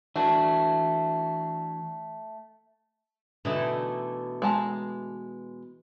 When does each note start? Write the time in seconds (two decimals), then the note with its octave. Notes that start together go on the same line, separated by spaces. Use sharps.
0.16 E3 A3 D4 F#4
3.45 B2 D3 E3 A3 D#4 E4
4.42 G#3 A5 A#5